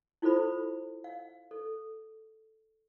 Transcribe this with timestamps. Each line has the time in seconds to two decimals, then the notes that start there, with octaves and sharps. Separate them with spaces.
0.22 E4 F4 A4 C5 B5
1.04 F5
1.51 A4